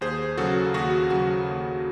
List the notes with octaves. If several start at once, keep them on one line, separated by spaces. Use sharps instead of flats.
D#2 G#4 C5
C#3 F#3 F#4 A4
D#2 F#4
C#3 F#3 F#4
D#2